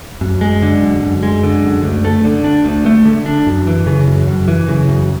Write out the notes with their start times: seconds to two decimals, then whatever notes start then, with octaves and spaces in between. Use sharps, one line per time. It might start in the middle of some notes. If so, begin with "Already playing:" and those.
0.21 F#2
0.41 G#3
0.62 D3
0.82 F#2
1.03 F#2
1.23 G#3
1.43 D3
1.63 F#2
1.84 D2
2.05 A3
2.25 D3
2.44 D4
2.65 D2
2.86 A3
3.05 D3
3.26 D4
3.46 F#2
3.67 E3
3.87 C#3
4.07 F#2
4.27 F#2
4.48 E3
4.68 C#3
4.89 F#2